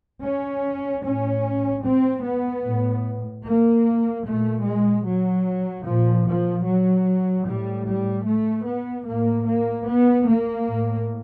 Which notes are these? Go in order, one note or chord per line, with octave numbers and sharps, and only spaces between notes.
C#4
A2 C#4
C4
B3
A2
A#3
A#2 A3
G#3
F#3
A#2 F3
F3
F#3
A2 G3
G3
A3
B3
A2 A#3
A#3
B3
A#3
A2